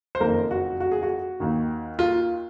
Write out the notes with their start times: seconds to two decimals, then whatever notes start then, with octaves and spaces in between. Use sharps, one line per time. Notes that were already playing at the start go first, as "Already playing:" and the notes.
0.15 C5
0.20 F#1 F2 D#3 A#4
0.51 F#4
0.80 F#4
0.92 G#4
1.02 F#4
1.40 D#2 D#3
1.99 F4